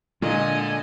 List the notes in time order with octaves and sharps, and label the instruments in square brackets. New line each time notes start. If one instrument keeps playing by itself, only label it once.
[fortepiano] A#2 [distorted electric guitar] D3 [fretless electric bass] G#3 [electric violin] D#5 G#5